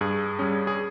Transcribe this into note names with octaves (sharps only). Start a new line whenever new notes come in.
G2 G#4
G3 C#4 G#4
G#4